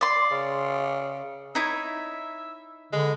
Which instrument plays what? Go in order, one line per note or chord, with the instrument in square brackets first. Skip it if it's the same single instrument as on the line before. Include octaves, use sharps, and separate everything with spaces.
[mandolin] D5 C6
[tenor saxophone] C#3
[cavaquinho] D#4 E4 C#5 [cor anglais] E5
[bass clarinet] D3 [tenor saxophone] G#3 [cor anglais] B4